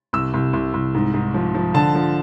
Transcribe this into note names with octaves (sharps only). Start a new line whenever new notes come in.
C2 E6
C2
C2
C2
G#2
G#2
F3
F3
D3 A5
F3